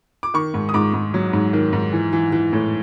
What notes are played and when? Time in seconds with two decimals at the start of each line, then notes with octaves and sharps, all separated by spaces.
0.23 D6
0.34 D#3 C#6
0.54 G#2
0.69 D#6
0.74 G#2 D6
0.94 G#2
1.14 F#3
1.33 G#2
1.53 D#3
1.73 G#2
1.93 E3
2.13 E3
2.33 E3
2.53 A2